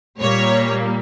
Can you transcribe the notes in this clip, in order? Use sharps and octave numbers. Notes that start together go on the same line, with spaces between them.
A#2 G3 A#3 C#5